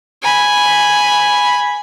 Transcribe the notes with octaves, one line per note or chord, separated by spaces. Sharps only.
G#5 B5